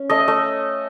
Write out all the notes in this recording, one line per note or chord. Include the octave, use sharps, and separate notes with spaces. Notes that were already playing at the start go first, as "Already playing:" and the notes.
Already playing: C#4
A3 D#5
A3